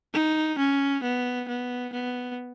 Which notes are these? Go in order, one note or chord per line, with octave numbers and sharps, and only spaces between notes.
D#4
C#4
B3
B3
B3